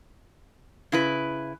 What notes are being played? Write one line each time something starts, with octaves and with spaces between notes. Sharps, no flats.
C#3 E4 B4